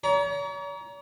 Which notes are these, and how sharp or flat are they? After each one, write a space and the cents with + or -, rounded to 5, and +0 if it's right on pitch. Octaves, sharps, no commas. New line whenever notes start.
C#5 +45 A#5 +20